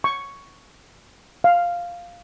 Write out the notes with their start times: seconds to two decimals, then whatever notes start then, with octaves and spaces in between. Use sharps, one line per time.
0.04 C#6
1.44 F5